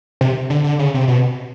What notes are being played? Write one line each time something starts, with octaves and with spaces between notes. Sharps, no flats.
C3
D3
D3
C#3
C3
B2